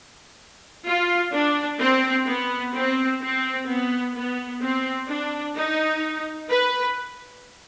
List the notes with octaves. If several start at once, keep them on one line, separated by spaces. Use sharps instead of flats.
F4
D4
C4
B3
C4
C4
B3
B3
C4
D4
D#4
B4